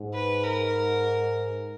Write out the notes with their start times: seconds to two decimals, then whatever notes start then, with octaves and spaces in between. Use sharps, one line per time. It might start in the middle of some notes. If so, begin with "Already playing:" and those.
Already playing: G#2
0.14 B4
0.43 A#4